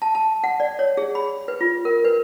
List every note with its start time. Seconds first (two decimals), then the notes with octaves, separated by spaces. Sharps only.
0.02 A5
0.15 A5
0.44 F#5
0.60 D5
0.79 C#5
0.97 G#4
1.15 B5
1.48 B4
1.61 F4
1.85 A#4
2.04 B4